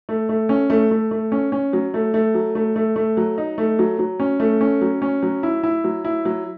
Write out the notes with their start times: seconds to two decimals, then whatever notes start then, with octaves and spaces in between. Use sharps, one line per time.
0.09 A3
0.29 A3
0.49 C#4
0.70 A3
0.91 A3
1.11 A3
1.32 C#4
1.52 C#4
1.73 F#3
1.94 A3
2.14 A3
2.34 F#3
2.55 A3
2.76 A3
2.96 A3
3.17 F#3
3.38 D#4
3.58 A3
3.79 F#3
3.99 F#3
4.20 C#4
4.40 A3
4.61 C#4
4.81 F#3
5.02 C#4
5.23 F#3
5.43 E4
5.63 E4
5.84 F#3
6.05 E4
6.25 F#3